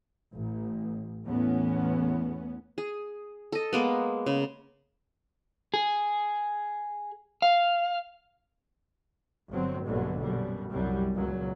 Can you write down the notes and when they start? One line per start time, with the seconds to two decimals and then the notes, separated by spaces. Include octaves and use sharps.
0.32 A1
1.26 E2 A2 B3 C#4
2.78 G#4
3.52 A4 D#5
3.73 G#3 A#3 B3
4.26 C#3
5.74 G#4
7.42 F5
9.50 G1 F#3 C4
9.86 A#1 G2 B2 D3 F#3
10.19 F#2 B2 G3
10.70 C2 F#2 F#3 G3
11.14 C#2 A#2 F#3